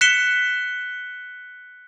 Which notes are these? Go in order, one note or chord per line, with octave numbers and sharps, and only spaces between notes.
F#6 B6 C#7 E7 G7